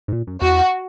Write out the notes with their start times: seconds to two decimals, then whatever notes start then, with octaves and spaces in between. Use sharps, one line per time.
0.08 G#2
0.12 A#2
0.27 F#2
0.42 E2 F#4